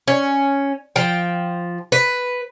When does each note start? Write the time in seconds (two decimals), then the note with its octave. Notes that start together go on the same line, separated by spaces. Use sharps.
0.07 C#4
0.96 F3 G5
1.92 B4